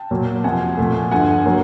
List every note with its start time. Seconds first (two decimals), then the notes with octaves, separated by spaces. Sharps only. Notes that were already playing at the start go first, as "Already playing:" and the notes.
Already playing: G5 A5
0.11 A#2 F#3 A#3
0.44 F2 C3 F3 F#5 G#5
0.78 A#2 F3 A3
1.11 G2 D3 F3 F#5 G#5
1.46 D3 F#3 A#3